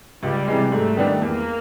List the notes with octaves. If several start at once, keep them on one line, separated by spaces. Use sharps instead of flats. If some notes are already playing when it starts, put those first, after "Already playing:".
C#2 G3
C3 E3 G#3
G#2 A3
D#3 G3 B3 D4
E2 A#3